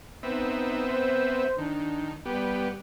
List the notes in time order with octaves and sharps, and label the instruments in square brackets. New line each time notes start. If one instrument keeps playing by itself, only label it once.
[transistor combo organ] B3 C4 E5 [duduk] D#4
[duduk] C5
[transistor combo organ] D#3 [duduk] D4
[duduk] G3 [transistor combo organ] B3 G4